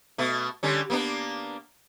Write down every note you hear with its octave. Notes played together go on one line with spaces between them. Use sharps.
B2 A3
D3 G3 C#4
A#3 B3 D4